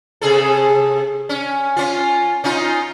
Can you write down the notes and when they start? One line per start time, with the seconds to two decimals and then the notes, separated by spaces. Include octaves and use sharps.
0.21 C3 G#4 A4
1.29 C#4
1.77 C#4 F4
2.44 C#4 D#4 F4